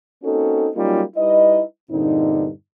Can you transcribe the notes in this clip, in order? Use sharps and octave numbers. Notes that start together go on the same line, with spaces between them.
A#3 C4 C#4 D#4 F#4 A4
F#3 G3 A#3 C#4 D#4 F4
G3 D#4 E4 B4 D#5
E2 G2 A#2 D3 C4 D#4